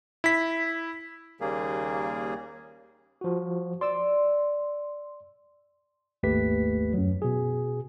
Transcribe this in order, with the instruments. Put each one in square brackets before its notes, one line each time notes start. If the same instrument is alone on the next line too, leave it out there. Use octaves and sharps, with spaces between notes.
[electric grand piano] E4 B6
[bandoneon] D#2 C#3 G3 A#3 G#4
[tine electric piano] F3 F#4
[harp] D5 E6 [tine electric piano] C6
[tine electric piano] G#1 D#2 A3 G4 B4 B6
F#2 F#3
B2 G#4